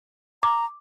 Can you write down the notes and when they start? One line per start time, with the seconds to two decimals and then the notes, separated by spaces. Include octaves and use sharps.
0.43 A#5 D6